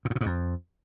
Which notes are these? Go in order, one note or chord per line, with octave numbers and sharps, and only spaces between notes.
A#2
G#2
B2
G#2
F2